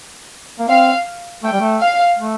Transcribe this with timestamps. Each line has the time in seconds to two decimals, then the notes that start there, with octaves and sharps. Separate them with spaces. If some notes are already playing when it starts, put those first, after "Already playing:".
0.59 A#3
0.69 C4 F5
1.44 A3 G5
1.53 G3
1.61 A3
1.82 F5
2.19 A3